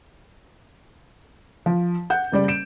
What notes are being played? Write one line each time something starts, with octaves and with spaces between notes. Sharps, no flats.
F3
F#5 G6
F#1 G3 D5
D7 E7